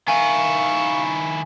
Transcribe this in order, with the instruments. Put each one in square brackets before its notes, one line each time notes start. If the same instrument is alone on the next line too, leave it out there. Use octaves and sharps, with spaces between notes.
[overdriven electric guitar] D#3 E4 [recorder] F5 [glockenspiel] G#5 [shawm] C#6